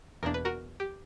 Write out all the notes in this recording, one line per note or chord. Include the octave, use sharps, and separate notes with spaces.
E2 B2 A#3 D4 A#4
B4
F#4 A#4
G4